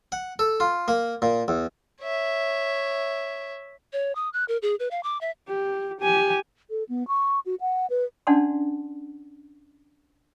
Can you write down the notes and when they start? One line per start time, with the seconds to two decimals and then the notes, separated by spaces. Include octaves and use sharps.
0.12 F#5
0.39 A4
0.60 F4
0.88 A#3
1.22 A#2
1.48 E2
2.02 C#5 E5
3.93 C#5
4.15 D#6
4.33 F#6
4.48 A#4
4.62 G#4
4.80 B4
4.91 F5
5.03 D6
5.21 E5
5.48 G4
6.00 G4 G#5
6.70 A4
6.89 B3
7.08 C#6
7.46 F#4
7.61 F#5
7.90 B4
8.27 C#4 D4 D5 F#5 A5 C6